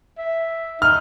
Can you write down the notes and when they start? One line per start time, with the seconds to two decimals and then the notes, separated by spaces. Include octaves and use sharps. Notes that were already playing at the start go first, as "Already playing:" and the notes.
0.18 E5
0.82 D#4 F6